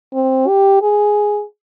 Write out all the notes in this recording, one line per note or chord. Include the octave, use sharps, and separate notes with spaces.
C4
G4
G#4